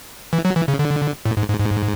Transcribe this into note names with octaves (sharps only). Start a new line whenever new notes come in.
E3
F#3
E3
C#3
D3
A2
G#2
G#2
G#2